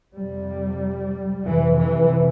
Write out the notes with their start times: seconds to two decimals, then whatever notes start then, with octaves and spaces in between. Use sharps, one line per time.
0.16 F2 C3 G3
1.47 F2 C3 E3
1.80 E3